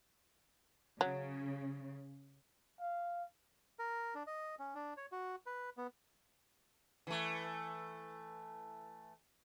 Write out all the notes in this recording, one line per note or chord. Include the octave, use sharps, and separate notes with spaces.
C#3 F#3
F5
A#4
D4
D#5
C#4
D4
C#5
F#4
B4
B3
E3 A3